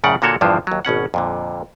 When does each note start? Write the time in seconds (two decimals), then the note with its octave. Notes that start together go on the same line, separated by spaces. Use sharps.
0.04 F#2 A2 C#3 D5 F#5
0.22 A#2 D3 A#3 F#4 A4 C#5
0.41 E2 G2 D3 E3 F3 C5
0.67 D#2 F#3
0.85 G#1 B2 C#4 F#5
1.14 F2 A#2 D3